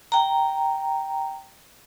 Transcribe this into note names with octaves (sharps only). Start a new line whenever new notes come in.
G5 A#5